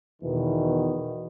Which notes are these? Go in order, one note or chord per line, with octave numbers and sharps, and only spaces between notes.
E2 B2 D#3 E3